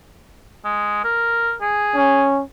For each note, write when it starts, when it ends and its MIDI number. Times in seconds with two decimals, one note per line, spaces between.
0.65 1.03 56
1.04 1.54 70
1.61 2.24 68
1.95 2.42 61